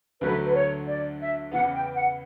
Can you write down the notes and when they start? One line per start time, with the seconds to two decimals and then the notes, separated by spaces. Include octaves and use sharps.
0.21 D2 D3 F#3 A3 B4
0.45 B4
0.54 C#5
0.87 D5
1.20 E5
1.51 E2 C#3 E3 B3 F#5
1.74 G5
1.95 F#5